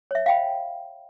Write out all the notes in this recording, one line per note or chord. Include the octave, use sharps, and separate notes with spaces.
C#5 E5
F5 G5 B5